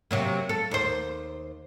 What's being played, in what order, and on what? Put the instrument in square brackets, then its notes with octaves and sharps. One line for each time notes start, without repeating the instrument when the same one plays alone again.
[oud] C3 F#3 A#3
A4
D#2 C5